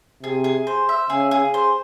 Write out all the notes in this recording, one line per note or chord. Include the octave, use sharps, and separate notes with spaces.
C3 G#4
G#4
C5
E5
C#3 G#4
G#4
C5